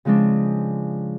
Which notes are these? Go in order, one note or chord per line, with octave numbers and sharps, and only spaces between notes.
C#3 F3 G#3 C4 D4